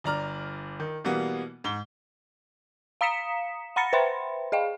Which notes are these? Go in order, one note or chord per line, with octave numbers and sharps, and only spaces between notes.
G1 D5 A#5 F6
D#3
B2 E3 G3 A#3 B3
G#2 G7
F5 A#5 D#6 B6 C#7 E7
F#5 A#5 B5 A6 A#6 C#7
B4 C5 E5 G5 B5 C6
G#4 D#5 F5 G5